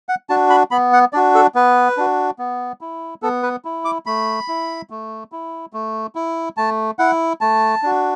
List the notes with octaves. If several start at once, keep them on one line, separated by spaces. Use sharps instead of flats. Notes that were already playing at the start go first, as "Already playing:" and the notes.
F#5
D4 F#4 A5
B5
B3 B5
F#5
D4 F#4 D5
A4
B3 B4
D4 F#4
B3
E4
B3 A4
B4
E4
D6
A3 B5
E4
A3
E4
A3
E4
A3 A5
E4 F#5
A3 A5
D4 F#4